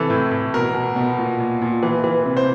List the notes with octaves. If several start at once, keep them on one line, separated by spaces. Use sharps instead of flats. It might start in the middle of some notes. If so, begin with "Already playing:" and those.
Already playing: C3 E3 A4
A2
A2
B2 A#4
B2
B2
A#2
A#2
A#2
E3
E3
C3
C5